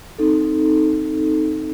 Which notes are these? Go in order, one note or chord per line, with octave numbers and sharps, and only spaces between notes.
C4 D#4 A4